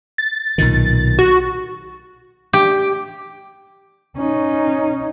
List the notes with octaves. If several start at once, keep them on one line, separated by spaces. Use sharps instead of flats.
A6
B1 A#2 D#3
F#4
G4
C#4 D#4